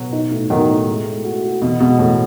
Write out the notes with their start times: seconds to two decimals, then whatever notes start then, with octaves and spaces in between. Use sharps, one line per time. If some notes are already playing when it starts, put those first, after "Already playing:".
Already playing: B2 F#3
0.13 D#4
0.31 A2
0.50 D#3 F#3 B3
0.69 A2
0.87 G#3
1.05 G#3
1.25 F#4
1.43 F#4
1.62 B2 E3
1.80 B2 G#3
1.99 A2 E3